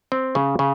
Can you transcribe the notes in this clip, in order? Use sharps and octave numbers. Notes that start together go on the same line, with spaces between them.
C4
C#3
C#3